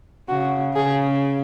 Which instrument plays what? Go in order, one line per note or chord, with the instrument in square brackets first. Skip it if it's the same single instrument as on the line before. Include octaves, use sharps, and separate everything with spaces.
[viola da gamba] C#3 [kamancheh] F#4
[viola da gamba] C#3 [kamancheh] G#4